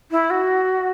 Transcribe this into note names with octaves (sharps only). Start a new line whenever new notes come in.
E4
F#4